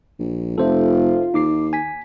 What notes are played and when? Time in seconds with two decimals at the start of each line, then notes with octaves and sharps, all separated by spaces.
0.19 A#1
0.58 F1 F4 A4 C5 E5
1.34 D#2 D#4 D6 C7
1.73 G#5 B6